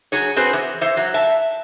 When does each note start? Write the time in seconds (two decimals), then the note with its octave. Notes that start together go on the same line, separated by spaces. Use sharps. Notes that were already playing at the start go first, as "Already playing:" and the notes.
0.12 F#3 G#4 C#5
0.36 C4 F#4 G#4 B4 C5
0.53 E3
0.81 E3 C5 E5
0.97 F#3
1.14 E5 A5